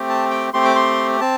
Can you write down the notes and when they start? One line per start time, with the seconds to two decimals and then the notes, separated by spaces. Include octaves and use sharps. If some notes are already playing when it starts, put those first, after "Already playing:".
Already playing: A3 C4 G4
0.09 A5
0.31 G5
0.53 A3 C4 G4 C6
0.65 D6
0.76 C6
1.21 C4 A5